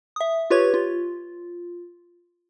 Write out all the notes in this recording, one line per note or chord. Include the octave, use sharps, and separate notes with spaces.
E5 D#6
F4 G4 B4 C#5 C#6 G#6
F4